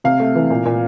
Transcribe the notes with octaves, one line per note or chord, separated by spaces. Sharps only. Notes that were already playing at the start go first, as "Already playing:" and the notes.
C3 F5
A3
E3
A#2
A#2